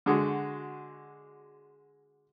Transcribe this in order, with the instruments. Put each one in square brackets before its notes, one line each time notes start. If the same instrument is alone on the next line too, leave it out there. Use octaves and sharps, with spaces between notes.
[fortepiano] D3 G#3 F#4